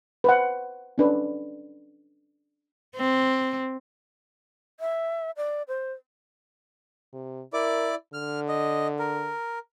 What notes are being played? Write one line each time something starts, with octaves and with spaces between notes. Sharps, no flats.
B4 C5 F#5
C#4 D4 B4
C4
E5
D5
C5
C3
E4 A#4 D5 D6
D3 F6
D#5
A#4